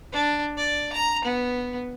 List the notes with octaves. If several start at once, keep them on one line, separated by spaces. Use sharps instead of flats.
D4
D5
A#5
B3